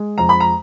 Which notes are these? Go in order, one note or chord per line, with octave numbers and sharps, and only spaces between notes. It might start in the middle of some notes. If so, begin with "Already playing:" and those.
Already playing: G#3
F2 A#5
B5
A#5